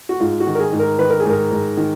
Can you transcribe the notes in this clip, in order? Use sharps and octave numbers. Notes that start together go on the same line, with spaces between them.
F#4
G#2 F4
F#4
D#3
A#4
G#4
G#2
A#4
D#3 B4
A#4
G#4
G#2 A#4
G#2
D#3